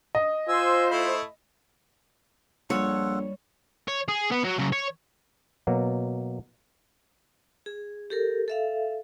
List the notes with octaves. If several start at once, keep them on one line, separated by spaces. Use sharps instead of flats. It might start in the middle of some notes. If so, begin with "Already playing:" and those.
D#5
F4 C5 G#5 E6
A3 E4 B5
A#1 G3 F4 A4 C#5 F#5
C#5
G#4
B3
F#3
C#3 F#3
C#5
B2 F#3 A#3
G#4
G4 A4 A#4
A4 E5 F5